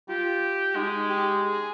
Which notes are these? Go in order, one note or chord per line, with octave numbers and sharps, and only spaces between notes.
F4 G4
G#3 D#4
G4
G#4